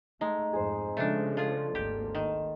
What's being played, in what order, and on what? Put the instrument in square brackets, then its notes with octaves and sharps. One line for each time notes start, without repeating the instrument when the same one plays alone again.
[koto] G#3 [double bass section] A3 [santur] D#4
[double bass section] F2 G#2 [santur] G#4 C5
[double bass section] C#3 F3 G#3 [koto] A3 D4 [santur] D5
[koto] F4 G#4 [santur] A4
[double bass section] G#1 D2 A#3 [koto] G4
[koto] D#3